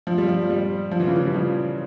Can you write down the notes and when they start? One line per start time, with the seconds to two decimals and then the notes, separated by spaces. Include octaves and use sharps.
0.07 F3
0.18 G3
0.28 F3
0.50 G3
0.91 F3
1.00 E3
1.07 C#3
1.16 E3
1.27 G3
1.34 F3